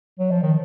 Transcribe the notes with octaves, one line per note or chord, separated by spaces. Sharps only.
F#3
F3
D#3